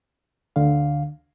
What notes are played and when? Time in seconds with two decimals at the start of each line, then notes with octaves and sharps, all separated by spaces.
0.56 D2 D3 F5